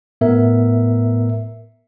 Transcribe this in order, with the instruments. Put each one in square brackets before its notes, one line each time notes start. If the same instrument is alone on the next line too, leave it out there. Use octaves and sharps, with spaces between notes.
[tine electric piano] A2 B3 A#4 E5